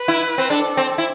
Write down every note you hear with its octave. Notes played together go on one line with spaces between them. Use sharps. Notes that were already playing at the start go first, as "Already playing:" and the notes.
Already playing: B4
E4
C4
D4 A4
C4
E4